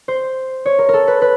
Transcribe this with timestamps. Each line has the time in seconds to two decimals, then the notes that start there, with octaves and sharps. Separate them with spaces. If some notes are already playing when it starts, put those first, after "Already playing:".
0.08 C5
0.66 C#5
0.79 A#4
0.89 A4 A#4
1.08 B4
1.22 B4